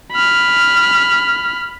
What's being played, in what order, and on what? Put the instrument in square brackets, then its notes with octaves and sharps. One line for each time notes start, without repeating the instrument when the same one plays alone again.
[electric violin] B5 F6